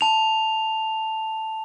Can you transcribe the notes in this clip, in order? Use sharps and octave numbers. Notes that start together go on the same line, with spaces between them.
A5 F7